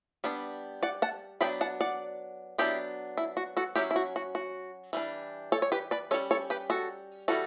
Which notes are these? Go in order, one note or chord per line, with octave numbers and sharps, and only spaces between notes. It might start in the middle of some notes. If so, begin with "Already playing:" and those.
G3 B3 D4
D5 F#5
F#5 A5
F#3 B3 D4 G5 B5
F#5 A5
D5 F#5
F#3 B3 D4 E4 G4
E4
F#4
F#4 A4
F#3 C#4 E4 G4
E4
F#4
F#4
F#4
E3 G3 D4
A4 C#5
C#5
G4 B4
B4 D5
G3 C#4 A4 C#5
A4 C#5
G4 B4
F#4 A4
E3 G3 F#4 A4